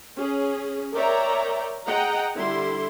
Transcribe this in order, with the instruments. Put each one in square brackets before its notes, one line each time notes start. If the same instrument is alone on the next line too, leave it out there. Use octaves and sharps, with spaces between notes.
[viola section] C#4 G#4
A#4 C#5 D5 E5 G5 A#5
G#4 D#5 F#5 G5 A#5
D3 G3 E4 C6